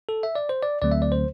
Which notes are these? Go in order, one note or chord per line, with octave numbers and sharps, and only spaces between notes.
A4
E5
D5
C5
D5
D2 D3 F#3 A3 C4 D5
E5
D5
C5